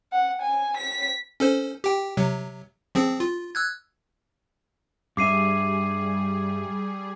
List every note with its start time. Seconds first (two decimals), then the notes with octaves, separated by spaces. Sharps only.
0.13 F#5
0.42 G#5
0.77 B6
1.40 C#4 A4 C5
1.84 G4 G5
2.17 C3 F#3
2.95 F3 C4 G#4
3.20 F4
3.55 E6 F#6 G#6
5.17 G2 G3 G#4 E5 D6 C7 D#7